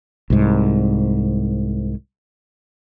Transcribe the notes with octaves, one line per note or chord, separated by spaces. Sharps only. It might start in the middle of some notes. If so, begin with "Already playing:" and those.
C2 G#2